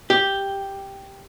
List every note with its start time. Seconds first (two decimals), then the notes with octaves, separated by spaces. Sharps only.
0.10 G4